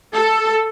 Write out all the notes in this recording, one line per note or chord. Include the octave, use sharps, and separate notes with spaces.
A4